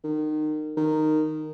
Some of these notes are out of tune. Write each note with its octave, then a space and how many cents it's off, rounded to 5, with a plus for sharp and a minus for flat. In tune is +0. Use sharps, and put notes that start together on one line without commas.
D#3 -25
D#3 -10